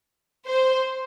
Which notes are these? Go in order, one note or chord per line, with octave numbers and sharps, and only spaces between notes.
C5